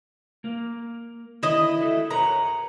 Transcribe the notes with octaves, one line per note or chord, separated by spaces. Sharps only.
A#3 A#4
D3 D#3 E4 D#5
F#4 A4 E5
A#4 B4 C#5 A#5